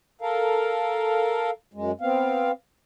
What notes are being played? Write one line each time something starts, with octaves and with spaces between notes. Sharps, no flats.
A4 A#4 F5
F#2 G#3
B3 C4 F5